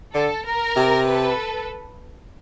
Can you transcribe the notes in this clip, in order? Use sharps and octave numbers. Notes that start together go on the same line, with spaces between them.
D3 A4
A#4
C3
A4 B4